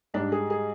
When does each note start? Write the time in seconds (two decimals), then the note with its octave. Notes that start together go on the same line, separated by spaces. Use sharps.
0.14 G#2 G3 D4
0.32 G#4
0.50 G#4